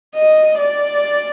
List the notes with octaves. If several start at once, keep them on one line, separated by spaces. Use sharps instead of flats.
D#5
D5